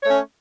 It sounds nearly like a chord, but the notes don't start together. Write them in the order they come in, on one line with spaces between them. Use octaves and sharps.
C#5 A3 C#4